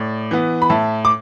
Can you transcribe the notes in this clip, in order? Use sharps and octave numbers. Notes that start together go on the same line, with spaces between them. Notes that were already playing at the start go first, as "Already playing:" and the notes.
Already playing: A2 D5
E3 B3
B5
A2 E5 A5
D6